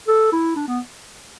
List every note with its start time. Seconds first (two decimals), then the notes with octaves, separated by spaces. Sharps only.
0.08 A4
0.32 E4
0.56 D4
0.68 B3